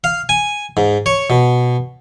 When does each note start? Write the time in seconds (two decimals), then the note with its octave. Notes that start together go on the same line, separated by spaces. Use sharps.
0.04 F5
0.29 G#5
0.77 G#2
1.06 C#5
1.30 B2